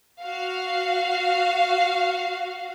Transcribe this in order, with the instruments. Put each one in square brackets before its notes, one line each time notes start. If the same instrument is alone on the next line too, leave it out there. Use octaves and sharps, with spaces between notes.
[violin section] F#4 F5